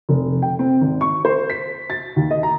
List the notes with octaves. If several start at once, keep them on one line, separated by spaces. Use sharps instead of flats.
F1
G5
C4
G#1
C#6
C5
B6
A6
D#2
D#5
A#5